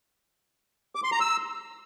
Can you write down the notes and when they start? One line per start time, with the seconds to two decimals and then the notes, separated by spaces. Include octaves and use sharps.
0.95 D6
1.04 C6
1.12 A#5
1.20 E6